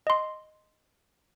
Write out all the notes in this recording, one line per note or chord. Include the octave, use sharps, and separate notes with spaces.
D#5 C6